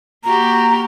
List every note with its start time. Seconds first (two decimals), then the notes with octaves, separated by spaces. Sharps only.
0.24 A#3 F#4 G4 A#5